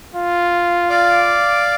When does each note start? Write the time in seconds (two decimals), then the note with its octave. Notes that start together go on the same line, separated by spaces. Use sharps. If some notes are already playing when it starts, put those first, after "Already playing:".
0.15 F4
0.90 D5 F5 D6